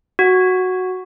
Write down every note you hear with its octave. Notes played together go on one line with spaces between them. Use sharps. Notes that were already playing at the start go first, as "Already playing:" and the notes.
F#4